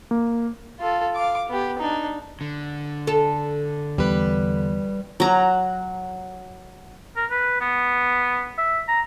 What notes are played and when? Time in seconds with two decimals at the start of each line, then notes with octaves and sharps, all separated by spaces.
0.11 A#3
0.79 F4 A4
1.15 F5 D6
1.49 B3 G4
1.78 D4 D#4
2.41 D3
3.07 A4
3.98 E2 G3 B4
5.20 F#3 A#5
7.16 A#4
7.31 B4
7.61 B3
8.58 E5
8.88 A#5